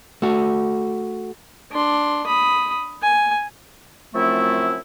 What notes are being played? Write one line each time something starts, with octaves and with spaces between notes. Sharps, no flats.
A3 F#4
D4 C6
B5 D#6
G#5
F#2 F3 A3 C4 E4